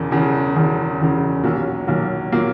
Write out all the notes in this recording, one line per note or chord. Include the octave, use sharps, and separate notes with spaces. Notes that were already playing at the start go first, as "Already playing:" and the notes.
Already playing: E1 E2 C#3
E1 E2 C#3
E1 E2 C#3
E1 E2 C#3
B1 A#2 F#3 A#3
B1 A#2 F#3 A#3
A#2 F#3 A#3